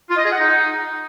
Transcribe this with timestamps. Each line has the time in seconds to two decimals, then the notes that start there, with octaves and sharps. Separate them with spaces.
0.09 F4
0.17 D#5
0.24 G#4
0.32 F#5
0.39 D#4